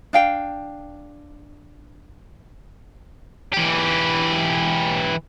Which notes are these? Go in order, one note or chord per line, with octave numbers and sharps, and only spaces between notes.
D4 F5 G5
E3 G4